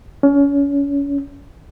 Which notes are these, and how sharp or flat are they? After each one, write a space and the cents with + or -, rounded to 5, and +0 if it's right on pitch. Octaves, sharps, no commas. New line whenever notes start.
C#4 +30